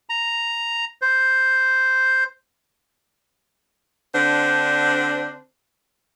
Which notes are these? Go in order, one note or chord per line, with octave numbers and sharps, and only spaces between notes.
A#5
C5
D3 C4 D4 C5